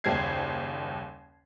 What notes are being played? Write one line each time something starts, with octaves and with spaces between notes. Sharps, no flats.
F#1 D#2 G3 C5 G#6 C7